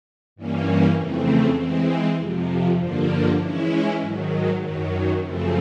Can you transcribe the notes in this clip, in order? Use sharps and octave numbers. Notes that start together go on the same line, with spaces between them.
G2 E3 G3 A#3 C#4
F2 C#3 E3 A3 C4
E3 G#3 C4
F2 C3 F3
G2 D3 F3 A#3 D4
E3 G#3 C#4 E4
G#2 D#3 F#3
F#2 D#3 F#3
F#2 C#3 F3 A3 C4